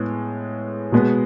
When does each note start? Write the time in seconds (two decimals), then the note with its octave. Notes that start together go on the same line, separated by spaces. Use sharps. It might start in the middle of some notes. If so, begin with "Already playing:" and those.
Already playing: A2 G#3 B3
0.92 B2 G#3 B3